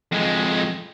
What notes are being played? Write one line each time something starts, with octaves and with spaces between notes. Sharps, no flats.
F2 G#3